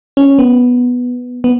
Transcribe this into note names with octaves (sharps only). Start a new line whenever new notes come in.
C#4
B3
B3